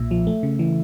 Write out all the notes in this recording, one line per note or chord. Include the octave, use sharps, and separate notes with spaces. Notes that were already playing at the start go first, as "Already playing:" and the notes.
Already playing: B1 A#2 E5
F3
A3
C#3
E3